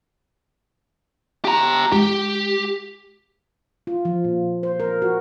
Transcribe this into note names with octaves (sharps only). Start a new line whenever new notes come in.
G4 A#5
G#3 E4 G4
F4
F3
A#2
C5
A#4
F#4